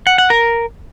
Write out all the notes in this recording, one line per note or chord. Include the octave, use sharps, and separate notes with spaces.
F#5
F#5
A#4